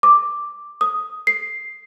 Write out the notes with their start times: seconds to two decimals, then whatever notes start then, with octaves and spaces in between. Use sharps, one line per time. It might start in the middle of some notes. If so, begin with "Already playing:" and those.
0.03 D6
0.81 D#6
1.27 C7